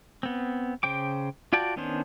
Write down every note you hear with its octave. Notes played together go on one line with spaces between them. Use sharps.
B3 C4
C#3 C5 G5 D6
F4 F#4 D5 G5 A5
D#3 B3 C#4 D4 C5